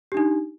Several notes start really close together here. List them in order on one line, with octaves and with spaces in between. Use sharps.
G4 D4 D#4